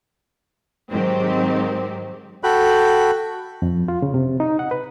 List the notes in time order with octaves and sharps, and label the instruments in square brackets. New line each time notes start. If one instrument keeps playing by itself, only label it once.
[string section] G#2 D#3 F#3 G#3 C4 G4
[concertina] F#4 A4 G5 B5 F#6
[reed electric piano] F2
F4
C#3
C3
D#4
F#5
B4